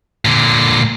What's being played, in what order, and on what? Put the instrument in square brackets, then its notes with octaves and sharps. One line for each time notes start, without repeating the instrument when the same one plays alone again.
[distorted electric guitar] A#2 D3